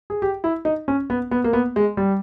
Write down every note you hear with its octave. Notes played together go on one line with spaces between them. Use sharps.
G#4
G4
E4
D#4
C#4
B3
B3
A#3
B3
G#3
G3